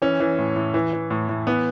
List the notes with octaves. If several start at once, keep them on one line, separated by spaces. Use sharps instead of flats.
E3 C#4
E3
A2
A2
E3
E3
A2
A2
E3 B3